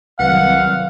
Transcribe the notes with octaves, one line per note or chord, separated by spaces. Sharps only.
C2 D#3 F#3 B4 F5 F#5